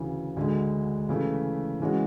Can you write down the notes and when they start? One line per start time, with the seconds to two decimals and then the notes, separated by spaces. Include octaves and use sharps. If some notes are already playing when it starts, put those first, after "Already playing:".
Already playing: D2 C#3 E3
0.36 D2 D3 G#3
1.09 C#3 E3 A3 E4
1.80 C#3 E3 G#3 C#4 F#4